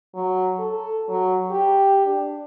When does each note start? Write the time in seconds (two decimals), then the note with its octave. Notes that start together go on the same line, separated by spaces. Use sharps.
0.14 F#3
0.59 A4
1.08 F#3
1.51 G4
2.06 D4